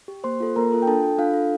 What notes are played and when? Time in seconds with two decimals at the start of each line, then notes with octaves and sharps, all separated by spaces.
0.08 G4
0.24 A#3 C5 C6
0.40 F4 A4
0.56 A#3 A#4 A#5
0.72 F4 A4
0.82 G5
0.87 D4 A4 A5
1.03 A4
1.18 D4 F4 F5
1.34 A4